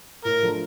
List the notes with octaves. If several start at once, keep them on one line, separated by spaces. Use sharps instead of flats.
A2 A#4
F3 A3 D4 F4